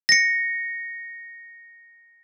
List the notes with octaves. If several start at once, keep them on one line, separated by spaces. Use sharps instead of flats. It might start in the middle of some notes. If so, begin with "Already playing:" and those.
A#6 C#7